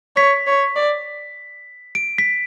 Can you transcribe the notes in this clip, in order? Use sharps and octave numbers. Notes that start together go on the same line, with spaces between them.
C#5 B6
C#5
D5
D7
B6